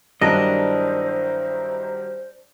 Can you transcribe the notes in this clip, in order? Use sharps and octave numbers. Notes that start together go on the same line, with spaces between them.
G2 D#3 F#3 D4 E4 A#4 C5 D#5